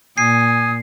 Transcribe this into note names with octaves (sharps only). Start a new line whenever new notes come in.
A#2 G#5 D#6 C7